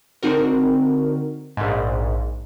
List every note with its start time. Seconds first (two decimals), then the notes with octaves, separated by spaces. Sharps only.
0.23 D3 C4 D#4 F#4 A#4
1.57 A#1 G#2